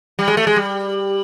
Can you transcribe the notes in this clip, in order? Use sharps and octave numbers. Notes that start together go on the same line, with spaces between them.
G3
G#3
A3
G#3
G3